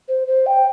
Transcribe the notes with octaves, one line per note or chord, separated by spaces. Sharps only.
C5
C5
G5